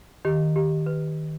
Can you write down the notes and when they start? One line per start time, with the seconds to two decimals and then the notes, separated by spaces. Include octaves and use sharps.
0.25 D#3 G4
0.56 G4
0.86 B4